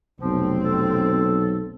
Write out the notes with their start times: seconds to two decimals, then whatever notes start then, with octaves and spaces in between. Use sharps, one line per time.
0.21 F1 B1 F3 C4
0.65 A4